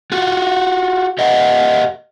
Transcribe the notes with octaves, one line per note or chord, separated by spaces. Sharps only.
F4 F#4
G4 A#4 D#5 E5 F#5